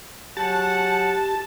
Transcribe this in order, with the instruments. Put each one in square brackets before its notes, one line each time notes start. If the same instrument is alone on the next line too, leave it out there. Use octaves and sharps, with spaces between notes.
[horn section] F#3 G#4 F#5 [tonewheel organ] G4 [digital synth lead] A5